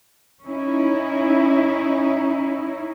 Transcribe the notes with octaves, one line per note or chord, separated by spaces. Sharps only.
C#4 D#4 E4